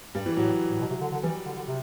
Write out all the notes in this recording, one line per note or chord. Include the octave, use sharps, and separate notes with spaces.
G2 G3
E3
A2 F#3
A2
B2
C3
D3
D3
E3 G3
D3
D3
C3